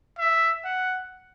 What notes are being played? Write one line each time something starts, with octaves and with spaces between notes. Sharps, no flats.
E5
F#5